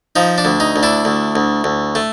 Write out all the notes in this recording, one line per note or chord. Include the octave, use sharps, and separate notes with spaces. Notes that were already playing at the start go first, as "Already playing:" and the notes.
F3 D#4
D4
D2
D#4
D2
D4 E4
D2
D2
D2
A3